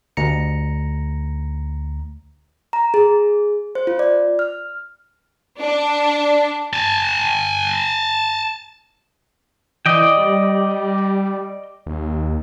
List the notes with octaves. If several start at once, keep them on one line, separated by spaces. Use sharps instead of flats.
D2 A#5 C#7
A#5
G#4
C5
F4
D5
F6
D4
G#5 A5
E3 D5 D#5 G5
G3
D#2